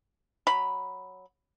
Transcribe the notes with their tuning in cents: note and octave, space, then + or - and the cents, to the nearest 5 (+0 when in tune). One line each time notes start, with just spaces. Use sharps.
F#3 +0 B5 +0